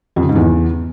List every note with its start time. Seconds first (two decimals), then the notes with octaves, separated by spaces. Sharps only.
0.16 F2
0.23 C#3
0.29 G#2
0.35 E2